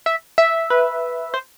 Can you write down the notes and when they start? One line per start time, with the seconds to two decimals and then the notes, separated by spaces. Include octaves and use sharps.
0.06 E5
0.38 E5
0.70 B4
1.34 C5